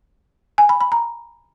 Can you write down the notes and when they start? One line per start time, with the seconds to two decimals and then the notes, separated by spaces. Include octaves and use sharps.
0.58 G#5
0.69 B5
0.81 B5
0.92 A#5